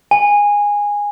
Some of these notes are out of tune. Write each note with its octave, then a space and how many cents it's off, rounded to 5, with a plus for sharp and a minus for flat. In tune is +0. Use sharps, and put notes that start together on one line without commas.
G#5 -15